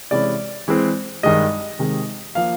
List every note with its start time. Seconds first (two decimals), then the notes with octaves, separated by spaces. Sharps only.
0.11 C3 E3 G#3 C#4 E4 D5
0.68 E3 G#3 C4
1.23 G2 D#3 G#3 D#5
1.79 C3 D#3 G#3
2.35 F3 A#3 F5